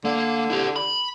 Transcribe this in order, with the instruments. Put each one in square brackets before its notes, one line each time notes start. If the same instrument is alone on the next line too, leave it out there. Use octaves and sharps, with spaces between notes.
[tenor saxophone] D3 [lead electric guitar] A#3
[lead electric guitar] E4 G4
B5